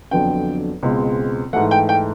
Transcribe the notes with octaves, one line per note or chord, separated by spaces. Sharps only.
F2 D3 F#3 B3 D4 G5
C#2 B2 G#3 C4
G#2 E3 A3 F#5
G5
G5